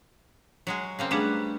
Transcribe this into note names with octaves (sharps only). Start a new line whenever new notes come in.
F#3 G#3 G#4
C#3 A#3 C4
G3 A3 D4 F#4 G#4 B4